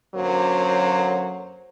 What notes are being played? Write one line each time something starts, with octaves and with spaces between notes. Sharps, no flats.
F#2 D3 F#3 A#3 C5